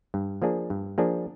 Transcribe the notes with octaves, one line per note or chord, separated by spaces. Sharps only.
G2
F3 A#3 D4 G#4
G2
F3 A#3 D4 G#4